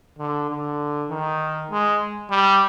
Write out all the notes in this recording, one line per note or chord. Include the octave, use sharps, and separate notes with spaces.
D3
D3
D#3
G#3
G3